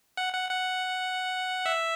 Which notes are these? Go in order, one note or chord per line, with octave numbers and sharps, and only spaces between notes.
F#5
F#5
F#5
E5